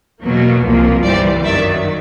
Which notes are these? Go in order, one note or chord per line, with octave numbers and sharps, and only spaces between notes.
E2 B2 F#3 A#3
C2 A#2 F3 A#3
G1 G2 E3 G3 C5 D5
F#2 D#3 F#3 D5 E5